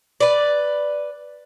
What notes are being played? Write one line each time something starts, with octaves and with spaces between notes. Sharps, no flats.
B4 D5